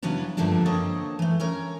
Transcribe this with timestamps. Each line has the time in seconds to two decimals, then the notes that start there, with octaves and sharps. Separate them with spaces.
0.02 C#3 E3 F#3 B3 C#4 D4
0.37 G2 D3 F3 A3 A#3 D4
0.65 D3 A#3 C4 C#5 D#5 A5
1.19 E3 A3
1.40 C#4 A#4 C#5